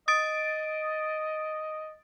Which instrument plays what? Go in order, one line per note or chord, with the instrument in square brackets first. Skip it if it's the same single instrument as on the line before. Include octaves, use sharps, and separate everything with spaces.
[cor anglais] D#5 [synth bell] D#6 A6 D7